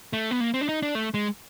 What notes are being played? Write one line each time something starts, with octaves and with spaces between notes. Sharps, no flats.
A3
B3
A#3
C4
D4
D#4
D4
A3
G#3